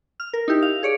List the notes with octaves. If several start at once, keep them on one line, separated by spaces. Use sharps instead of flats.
F6
A#4
D#4 E4 G4
F5
G#4 C#5 D5